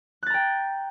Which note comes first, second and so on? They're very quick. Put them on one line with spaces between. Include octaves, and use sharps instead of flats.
F#6 A6 A#5 G5